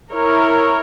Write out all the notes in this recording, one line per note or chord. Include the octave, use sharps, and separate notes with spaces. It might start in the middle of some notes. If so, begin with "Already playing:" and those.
E4 A#4 C#5